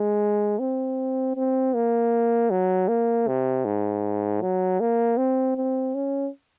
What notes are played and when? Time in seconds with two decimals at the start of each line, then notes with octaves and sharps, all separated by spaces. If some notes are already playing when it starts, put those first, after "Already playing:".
Already playing: G#3
0.60 C4
1.36 C4
1.74 A#3
2.51 F#3
2.89 A#3
3.27 C3
3.65 G#2
4.42 F#3
4.80 A#3
5.18 C4
5.56 C4
5.95 C#4